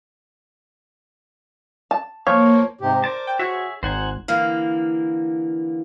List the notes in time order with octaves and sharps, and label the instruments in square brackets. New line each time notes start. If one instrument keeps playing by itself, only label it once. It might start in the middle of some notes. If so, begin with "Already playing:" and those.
[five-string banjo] A5
[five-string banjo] F3 [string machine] A#3 [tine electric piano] C#5
[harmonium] G#2 C3 G4
[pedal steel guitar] A#4 D5 A5 [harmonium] C5
[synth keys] G5
[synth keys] F#4 [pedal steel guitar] G#4 C#5 E5
[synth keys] G#1 [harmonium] D#4 [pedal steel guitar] C5 F#5 G#5
[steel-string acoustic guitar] D3 E3 A#3 [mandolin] F5